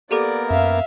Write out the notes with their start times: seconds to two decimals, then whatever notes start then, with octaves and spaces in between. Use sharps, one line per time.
0.11 A#3 B3 G4 A4 A#4 D5 D6
0.51 F#2 E5 F5